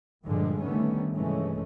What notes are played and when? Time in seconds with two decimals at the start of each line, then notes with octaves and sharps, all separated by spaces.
0.24 G2 A#2 D3 F3 G3 G#3
0.61 D3 D#3 G3 A3 B3 C#4
1.13 G2 C3 E3 G#3 A3 C#4